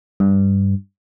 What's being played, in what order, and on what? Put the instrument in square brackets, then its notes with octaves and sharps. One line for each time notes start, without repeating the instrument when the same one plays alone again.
[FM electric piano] G2